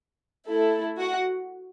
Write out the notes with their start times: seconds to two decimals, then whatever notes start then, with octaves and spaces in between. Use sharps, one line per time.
0.47 A3 E4 A4
0.99 F#4 F#5